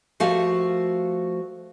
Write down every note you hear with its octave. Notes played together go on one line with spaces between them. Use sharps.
F3 A3 F#4 G4 A#4 F5